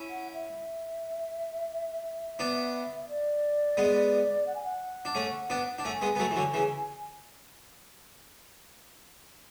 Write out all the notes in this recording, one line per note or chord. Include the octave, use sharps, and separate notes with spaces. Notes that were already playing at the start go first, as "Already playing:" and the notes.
Already playing: C#4 E4
F#5
E5
B3 D4
D5
G#3 B3
F#5
G#5
F#5
D4
A3 C#4
B3 D4
D4
A3 C#4 G#5
G#3 B3
B3
F#3 A3
E3
D3 F#3
C#3 E3